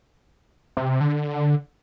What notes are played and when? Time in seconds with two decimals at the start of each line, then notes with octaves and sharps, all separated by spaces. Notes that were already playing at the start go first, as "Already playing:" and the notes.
0.77 C3
1.00 D3